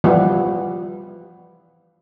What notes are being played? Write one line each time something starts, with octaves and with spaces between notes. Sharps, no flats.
E3 F3 G3 B3